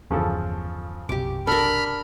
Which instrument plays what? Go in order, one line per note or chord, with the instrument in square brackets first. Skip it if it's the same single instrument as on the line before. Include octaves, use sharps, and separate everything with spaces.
[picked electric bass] G1 E2 [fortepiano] C#3 F3 A4
[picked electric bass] F#1 B1 C3 [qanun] G4 D6
[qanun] D4 A#4 [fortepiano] A4 [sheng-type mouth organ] B5 F6